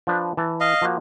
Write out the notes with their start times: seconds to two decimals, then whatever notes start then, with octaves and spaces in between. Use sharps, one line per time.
0.07 F3 D4 B4
0.37 E3 A5
0.60 D#5 F5
0.82 F3 A#3 F#4